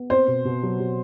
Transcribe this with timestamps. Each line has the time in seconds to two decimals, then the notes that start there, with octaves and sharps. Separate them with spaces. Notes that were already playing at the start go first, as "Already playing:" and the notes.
Already playing: B3
0.10 C4 C5
0.28 B2
0.45 B2
0.63 F#3
0.80 F#3